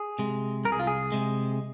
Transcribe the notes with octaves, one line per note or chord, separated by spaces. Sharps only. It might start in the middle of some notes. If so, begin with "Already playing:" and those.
Already playing: G#4
C3 G#3
C2 A#4
G#4
F4
G#4
C3 G#3